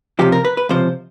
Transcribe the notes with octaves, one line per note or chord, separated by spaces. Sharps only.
C#2 C3 F3 G4
A#4
B4
B4
C#2 C3 F3 C5